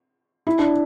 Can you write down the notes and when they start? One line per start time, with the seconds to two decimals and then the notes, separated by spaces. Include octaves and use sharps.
0.47 E4
0.59 D4